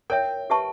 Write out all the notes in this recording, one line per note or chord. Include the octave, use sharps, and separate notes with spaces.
A#4 C#5 E5 G5
G4 B4 E5 A5 C#6